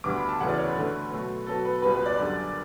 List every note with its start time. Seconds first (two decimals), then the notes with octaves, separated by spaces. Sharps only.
0.04 D2 D3 G3 B3 D6
0.16 B5
0.29 A5
0.40 D2 C#3 E3 B3 F#5
0.49 D5
0.58 C#5
0.67 B4
0.75 D2 D3 A3
1.11 B2 F#3 A3
1.47 B2 F#3 B3 A4
1.65 B4
1.82 C#2 B2 G3 B3 B4
1.94 B4
2.06 D5
2.18 F#2 D3 G3